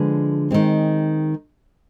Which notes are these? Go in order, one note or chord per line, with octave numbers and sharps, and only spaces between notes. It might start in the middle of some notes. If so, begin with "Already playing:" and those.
Already playing: D3 F3 G#3 D4 B4
D#3 G#3 C4